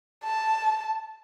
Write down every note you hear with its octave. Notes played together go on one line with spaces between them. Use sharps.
A5